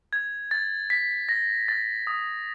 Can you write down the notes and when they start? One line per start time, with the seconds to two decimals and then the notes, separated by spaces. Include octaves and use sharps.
0.13 G#6
0.51 A6
0.90 B6
1.29 A#6
1.68 A6
2.07 D#6